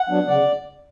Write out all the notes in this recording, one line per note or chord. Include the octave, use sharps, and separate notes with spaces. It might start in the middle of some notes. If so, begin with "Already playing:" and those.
Already playing: F#5
F#3 B3 D4
C#3 D5